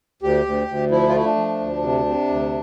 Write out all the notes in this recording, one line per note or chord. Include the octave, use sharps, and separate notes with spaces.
D2 G4
D2
D2
F3 E4
F4
A3 E4
D4
F3
D2
C3
C3
D2